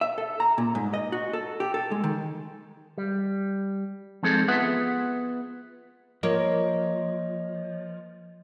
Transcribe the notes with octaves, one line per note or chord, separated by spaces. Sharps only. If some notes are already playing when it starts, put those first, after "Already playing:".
E5
A4
A#5
A#2
G#2
D#5
F#4
A4
G4
A4
G#3
D#3
G3
F3 G#3 C4 D#4 G#4 A4
B3 F4 G#4 B4 E5 F#5
F3 A#3 C#5 D#5